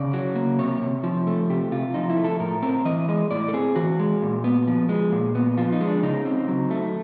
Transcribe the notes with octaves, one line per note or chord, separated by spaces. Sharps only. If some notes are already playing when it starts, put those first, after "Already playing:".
Already playing: C#3 D5
F#3
A#3
C3 C#5
C3
F3
A3
C3 G4
C3 F4
F3 D#4
E4
A3
A4
A2 A#4
C4 A#4
E3 D#5
G#3 D#5
A2 D5
A4
C4 G#4
E3 F#4
G#3
A#2
B3
F3
G#3
A#2
B3
F3 F4
D#4
G#3
D4
C#3 D#4
C4
F#3
A3